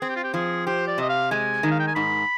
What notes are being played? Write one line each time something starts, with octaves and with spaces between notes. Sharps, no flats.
C4 G#4
G4
F4
G4
F3 G#4
G4 C5
D5
C3 D#5
F5
G#3 G#5
D#3
F5
G5
G#5
G#2 B5